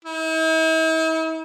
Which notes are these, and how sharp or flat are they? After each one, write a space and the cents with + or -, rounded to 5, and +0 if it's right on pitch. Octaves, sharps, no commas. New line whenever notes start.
E4 -45